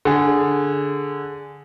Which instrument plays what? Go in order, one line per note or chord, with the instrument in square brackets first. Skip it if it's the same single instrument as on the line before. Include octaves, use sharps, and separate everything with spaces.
[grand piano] D3 G#4